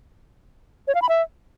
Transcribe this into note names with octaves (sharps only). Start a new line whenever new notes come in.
C#5
F5
B5
E5